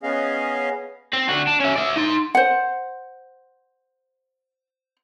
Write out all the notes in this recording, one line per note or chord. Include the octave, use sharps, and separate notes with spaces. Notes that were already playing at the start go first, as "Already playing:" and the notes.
B3 C#4 G#4 D#5 F5
C4
D3 F#4
D4
C#4 E5
D5 E5
D#4 C6
C5 F#5